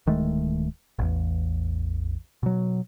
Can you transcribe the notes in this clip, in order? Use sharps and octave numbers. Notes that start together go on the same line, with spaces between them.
D1 D#3 G#3 A3
A1 E2
B2 F#3